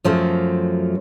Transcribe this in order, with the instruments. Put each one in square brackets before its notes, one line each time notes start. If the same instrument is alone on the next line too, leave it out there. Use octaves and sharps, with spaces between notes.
[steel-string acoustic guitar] F#2 F3 F#3 A3